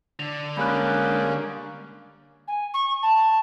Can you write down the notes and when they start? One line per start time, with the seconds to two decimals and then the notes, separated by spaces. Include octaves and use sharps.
0.19 D3 F7
0.57 G3 G#3 A#3 C#4 B5 F#6
2.48 G#5
2.74 C#6
3.02 A5